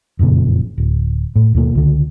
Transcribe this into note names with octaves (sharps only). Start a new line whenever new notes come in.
F#1 F2 A#2 C#3
D1
A2
D#2 B2 A#3
C#2 D3